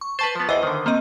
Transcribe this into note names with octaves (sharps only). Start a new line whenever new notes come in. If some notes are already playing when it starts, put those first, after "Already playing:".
C#6
B4 C5 A5 C#6 A6
F3 B3
E2 E3 C5 D#5
D3 D#3
A#3 C4 D#5